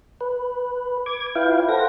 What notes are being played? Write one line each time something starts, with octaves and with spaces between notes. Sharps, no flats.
B4
D6 G#6
E4 F4 B4 F5 G5
A4 C5 F#5 A#6